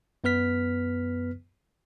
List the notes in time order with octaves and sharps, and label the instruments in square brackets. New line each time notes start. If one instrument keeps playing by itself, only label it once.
[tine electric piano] F#2 B3 B4 F6 B6